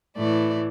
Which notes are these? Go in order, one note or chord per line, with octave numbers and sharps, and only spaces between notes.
A2 E3 A3 D5